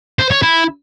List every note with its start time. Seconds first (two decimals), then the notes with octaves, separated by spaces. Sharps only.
0.19 C5
0.31 C#5
0.43 E4